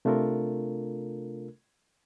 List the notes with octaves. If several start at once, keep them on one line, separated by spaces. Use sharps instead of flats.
C3 A3 D4 F4 A4 A#4